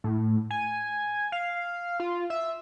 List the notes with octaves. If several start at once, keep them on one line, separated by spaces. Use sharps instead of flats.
A2
G#5
F5
F4
E5